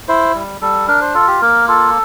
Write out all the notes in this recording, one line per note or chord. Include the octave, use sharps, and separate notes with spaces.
E4 C5
G3
G3 A4
D4 A#4
C5
F4 A4
G4
A#3 A#4
F4 A4